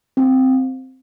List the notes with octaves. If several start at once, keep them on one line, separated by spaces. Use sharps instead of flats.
C4